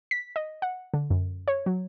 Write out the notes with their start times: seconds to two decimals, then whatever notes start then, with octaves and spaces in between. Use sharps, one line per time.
0.11 B6
0.36 D#5
0.62 F#5
0.94 D3
1.10 F#2
1.48 C#5
1.66 F#3